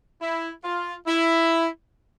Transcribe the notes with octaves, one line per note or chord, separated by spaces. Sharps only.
E4
F4
E4